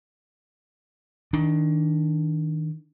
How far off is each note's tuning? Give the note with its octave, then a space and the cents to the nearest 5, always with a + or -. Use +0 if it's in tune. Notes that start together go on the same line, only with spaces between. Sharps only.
D#3 +20 D4 +0